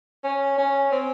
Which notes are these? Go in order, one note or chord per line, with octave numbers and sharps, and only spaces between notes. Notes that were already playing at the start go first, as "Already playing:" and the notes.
C#4
C#4
C4